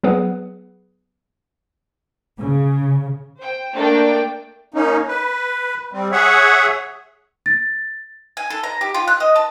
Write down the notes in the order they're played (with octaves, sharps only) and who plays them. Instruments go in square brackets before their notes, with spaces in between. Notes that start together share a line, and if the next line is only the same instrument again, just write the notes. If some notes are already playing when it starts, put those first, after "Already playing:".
[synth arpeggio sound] F#3 B3 G#4 B4 F#5
[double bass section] C#3
[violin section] C5 G5
A3 A#3 D4 A#4 D5 G5
[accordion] A#3 C#4 D#4
B4
G3 C4
G#4 C#5 E5 F#5
[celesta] A6
[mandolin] G#5
A4
A#5
G4
F4
F#6
D#5
A5